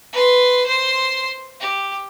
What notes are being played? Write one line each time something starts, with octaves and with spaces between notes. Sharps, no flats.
B4 C6
C5 C6
G4